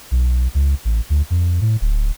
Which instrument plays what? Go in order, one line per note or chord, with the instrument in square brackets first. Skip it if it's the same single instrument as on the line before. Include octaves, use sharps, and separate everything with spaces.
[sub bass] B1
C#2
A1
D2
F2
A2
D1